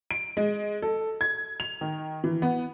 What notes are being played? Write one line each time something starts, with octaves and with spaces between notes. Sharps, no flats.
D7
G#3
A4
G#6
F7
D#3
E3
B3